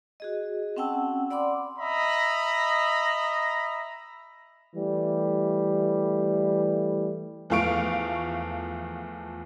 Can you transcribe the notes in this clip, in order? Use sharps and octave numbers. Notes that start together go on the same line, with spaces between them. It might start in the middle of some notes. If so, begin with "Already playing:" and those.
F#4 G#4 D#5
C4 C#4 F#5 G5 A5 E6
D5 F#5 B5 C6 D6
D#5 E5 A#5 B5
E3 G3 A3
E2 F3 A3 F5 C#6 D7